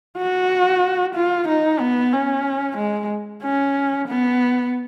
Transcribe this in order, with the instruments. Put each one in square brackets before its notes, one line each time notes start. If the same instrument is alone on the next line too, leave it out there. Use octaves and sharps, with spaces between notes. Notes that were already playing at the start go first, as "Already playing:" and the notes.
[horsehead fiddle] F#4
F4
D#4
B3
C#4
G#3
C#4
B3